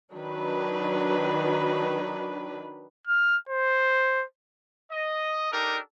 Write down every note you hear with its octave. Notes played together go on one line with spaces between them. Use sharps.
D#3 F#3 D4 B4
F6
C5
D#5
D4 D#4 G4 A4 A#4